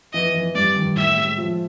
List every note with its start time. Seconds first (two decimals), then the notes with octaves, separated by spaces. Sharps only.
0.13 E3 D#5
0.34 E3
0.55 G2 D5
0.76 D#3
0.96 A2 E5
1.17 G#3
1.38 F3